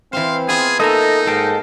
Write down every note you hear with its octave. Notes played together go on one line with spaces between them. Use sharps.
E3 C4 C5 F5
B3 F4 G#4 G#5
A#3 D#4 A4 D#5 E5 G#5 A#5
G#2 A4 F5 G5